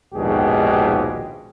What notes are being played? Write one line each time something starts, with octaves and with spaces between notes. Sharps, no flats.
A#1 D#2 G#2 B2 G4 G#4